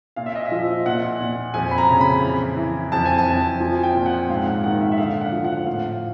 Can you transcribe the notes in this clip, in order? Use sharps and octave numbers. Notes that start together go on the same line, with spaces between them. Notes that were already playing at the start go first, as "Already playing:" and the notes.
A#2 F5
E5
D#5
E5
F3
A#2 F#5
A#2
F2 G#5
B5
A#5
C#3
B5
E3
E3
F2 A5
G#5
A5
F2
F3 G#5
G5
A#2
F#5
G#2 F5
F#5
D#3 F#5
E5
E5
D3 F5
F#5
F3
F#5
A2 F5